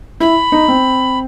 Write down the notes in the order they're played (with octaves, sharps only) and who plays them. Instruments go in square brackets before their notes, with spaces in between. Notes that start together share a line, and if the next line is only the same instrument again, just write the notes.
[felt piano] E4 [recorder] B5
[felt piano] D#4
C4